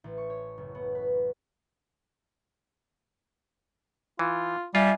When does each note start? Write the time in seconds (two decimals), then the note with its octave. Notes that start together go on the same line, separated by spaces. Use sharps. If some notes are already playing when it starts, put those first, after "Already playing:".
0.04 A1
0.18 C#6
0.30 C#5
0.58 F#1
0.75 B3
0.95 B4
4.19 E3 F4
4.75 G3 F4 E5 G#5